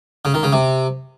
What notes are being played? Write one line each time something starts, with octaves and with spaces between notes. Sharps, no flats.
C#3
D#3
C#3
C3